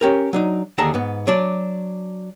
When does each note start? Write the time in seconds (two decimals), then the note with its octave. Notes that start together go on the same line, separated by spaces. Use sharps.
0.01 C#4 G4 A#4
0.33 F#3 D4 D#4
0.78 D#2 D3 G#4 A5 A#5
0.94 G#2 B3
1.27 F#3 D4 D5